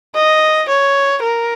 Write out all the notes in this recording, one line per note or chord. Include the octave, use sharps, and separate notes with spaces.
D#5
C#5
A#4